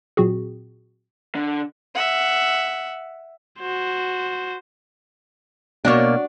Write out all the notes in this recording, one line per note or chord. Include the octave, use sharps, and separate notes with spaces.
A#2 F#3 C4 F#4 G#4
D3
E5 F#5
F#4 C5
B2 A#3 D4 F#4 C#5